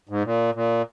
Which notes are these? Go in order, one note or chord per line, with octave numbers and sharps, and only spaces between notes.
G#2
A#2
A#2